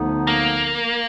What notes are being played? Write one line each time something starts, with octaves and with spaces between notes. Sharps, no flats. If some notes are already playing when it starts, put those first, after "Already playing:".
Already playing: D2 D3 F3 B3 D#4
A#3